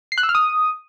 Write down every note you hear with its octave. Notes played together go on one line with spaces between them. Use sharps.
C7
F#6
E6
F6
D#6